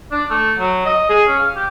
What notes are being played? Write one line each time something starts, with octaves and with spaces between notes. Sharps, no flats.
D4
A3
F#3
D#5
G#4
C#4
F5
G4